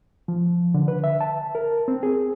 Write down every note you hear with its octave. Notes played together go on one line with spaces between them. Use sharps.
F3
D3
B4
E5
A5
A#4
C4
G#4